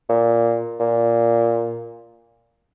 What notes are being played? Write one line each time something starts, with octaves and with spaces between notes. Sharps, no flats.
A#2
A#2